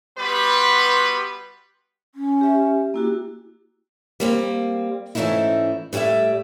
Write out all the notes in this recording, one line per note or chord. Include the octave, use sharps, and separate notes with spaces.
G3 B3 F#4 G4 B4 C6
C#4
G4 E5
A#3 E4 F#4 G4
G3 A#3 C4
G#2 E3 A3 C#4 D#4 E4
A2 G3 A3 D5 E5